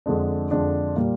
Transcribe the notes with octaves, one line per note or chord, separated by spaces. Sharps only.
F2 D3 G#3 D4
F2 D3 G#3 D4
A#2 G3 A#3